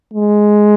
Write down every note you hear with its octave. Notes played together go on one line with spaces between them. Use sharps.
G#3